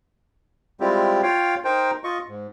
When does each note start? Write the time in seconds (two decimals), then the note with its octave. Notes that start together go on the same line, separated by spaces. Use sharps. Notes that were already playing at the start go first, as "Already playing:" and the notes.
0.80 G3 G#3 C4 E4 F4 G4
1.23 F4 C#5 F5 G5
1.65 D#4 A#4 C5 G5
2.04 F4 D#5 C#6
2.27 G#2